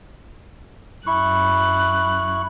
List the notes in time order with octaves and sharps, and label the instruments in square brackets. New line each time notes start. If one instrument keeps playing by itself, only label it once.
[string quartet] F#2 F#6 [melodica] E4 C#6